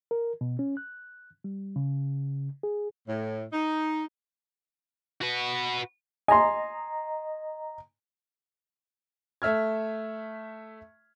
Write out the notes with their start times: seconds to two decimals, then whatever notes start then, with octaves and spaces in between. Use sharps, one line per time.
0.11 A#4
0.41 B2
0.59 C#4
0.77 F#6
1.44 G3
1.76 C#3
2.63 G#4
3.08 A2
3.53 D#4
5.21 F#4 B4
6.28 D#5 G#5 A#5 C6
9.42 A3 E5 F6 G#6